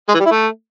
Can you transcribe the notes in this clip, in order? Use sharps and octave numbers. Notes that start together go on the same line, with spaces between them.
G#3
E3
G3
E4
A3